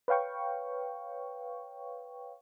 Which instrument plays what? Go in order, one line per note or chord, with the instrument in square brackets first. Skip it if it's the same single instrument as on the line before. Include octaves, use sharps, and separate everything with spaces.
[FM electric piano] B4 C#5 F5 G5 C#6